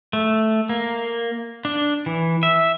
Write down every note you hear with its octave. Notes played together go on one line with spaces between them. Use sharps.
A3
A#3
D4
E3
E5